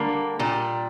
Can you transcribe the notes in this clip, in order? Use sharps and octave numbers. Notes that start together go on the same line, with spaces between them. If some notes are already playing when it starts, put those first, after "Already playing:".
Already playing: D3 G3 A#3
A#2 G3